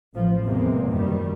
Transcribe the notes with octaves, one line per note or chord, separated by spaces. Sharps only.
A1 F3
E2 C3 G#3 A#3 C4
F#2 D#3 G3